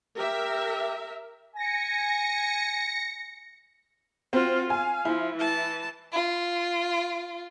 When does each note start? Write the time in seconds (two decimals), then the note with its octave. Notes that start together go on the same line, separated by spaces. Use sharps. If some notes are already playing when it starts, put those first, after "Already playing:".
0.16 G4 A#4 E5
1.56 G#5 A#6 C#7
4.33 C4 F4 F#4 C5
4.70 F5 G#5
5.05 F3 E4
5.36 E3 A5
6.13 F4